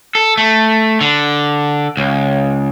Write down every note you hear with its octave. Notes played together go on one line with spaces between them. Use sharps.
A4
A3
D3
C#2